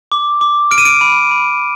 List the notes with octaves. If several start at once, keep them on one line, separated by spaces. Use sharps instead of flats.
D6
D6
F6 D7
D#7
D7
B5
B5